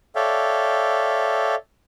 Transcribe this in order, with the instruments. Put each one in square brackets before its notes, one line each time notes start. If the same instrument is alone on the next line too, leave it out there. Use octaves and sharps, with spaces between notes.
[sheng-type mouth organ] A4 C#5 D5 E5 F5 G5